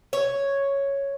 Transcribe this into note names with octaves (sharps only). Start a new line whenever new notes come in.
C#5